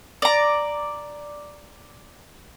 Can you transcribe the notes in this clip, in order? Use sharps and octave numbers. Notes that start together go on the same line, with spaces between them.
D5 A#5